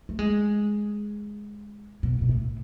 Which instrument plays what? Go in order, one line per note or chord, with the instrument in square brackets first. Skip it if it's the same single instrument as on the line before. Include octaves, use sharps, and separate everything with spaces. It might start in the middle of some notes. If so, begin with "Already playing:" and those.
[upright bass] A3
G#3
B2
B2
A2